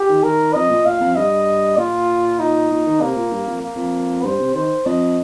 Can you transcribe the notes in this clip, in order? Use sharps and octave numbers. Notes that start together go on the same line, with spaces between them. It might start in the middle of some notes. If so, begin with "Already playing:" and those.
Already playing: G4
D#3
D#3 A#4
F2 D#5
A#2
A#2 F5
F2
G2 D#5
A#2 F4
D#4
A#2
D#3
C3 A#3
A#2
G2
F2
A#3
F2
G2 C5
C3
D#3 C5
F2 D#5